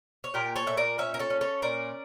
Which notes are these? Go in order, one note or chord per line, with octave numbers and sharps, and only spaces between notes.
C#5
A#2 G4 A#4
A4 C#5
A#2 E5
A#4 D5
C#4 C#5 E5
A#4
A4 C#5
C#4
A4 C#5
A#2 A#4 D5